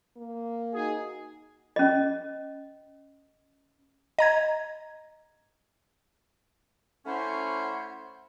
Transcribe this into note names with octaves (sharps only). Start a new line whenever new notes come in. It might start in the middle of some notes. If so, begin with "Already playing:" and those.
A#3
D#4 F#4 G#4
C#4 D#5
D#5 A#5 G#6
A3 C#4 E4 C5 C#5 F#5